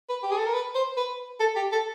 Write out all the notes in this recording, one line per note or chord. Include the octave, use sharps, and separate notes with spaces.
B4
G4
G#4
A4
A#4
B4
C5
B4
A4
G4
A4